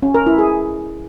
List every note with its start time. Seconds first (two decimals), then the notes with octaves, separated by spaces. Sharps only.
0.02 C#4
0.14 A#4
0.26 E4
0.38 G#4